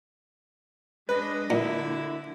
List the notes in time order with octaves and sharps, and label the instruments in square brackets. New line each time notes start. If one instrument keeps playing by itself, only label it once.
[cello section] G#3 D4 D#5 [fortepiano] B4
[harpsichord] A#2 [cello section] D3 [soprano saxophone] E4